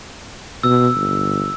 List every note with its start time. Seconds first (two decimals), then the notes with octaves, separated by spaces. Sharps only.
0.63 B2 E6
0.95 G1